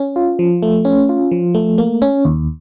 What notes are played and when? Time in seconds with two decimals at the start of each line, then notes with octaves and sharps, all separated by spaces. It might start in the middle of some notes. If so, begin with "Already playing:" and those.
Already playing: C#4
0.16 F4
0.39 F3
0.62 A3
0.85 C#4
1.09 F4
1.32 F3
1.55 A3
1.78 A#3
2.02 C#4
2.25 D#2